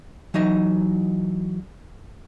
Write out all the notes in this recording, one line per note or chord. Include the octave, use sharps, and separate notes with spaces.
E3 F#3 D#4 D#5